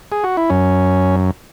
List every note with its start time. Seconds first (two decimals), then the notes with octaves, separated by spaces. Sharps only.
0.12 G#4
0.24 F#4
0.37 E4
0.50 F#2 C#4